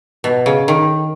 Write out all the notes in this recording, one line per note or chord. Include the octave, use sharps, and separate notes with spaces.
B2
C#3
D#3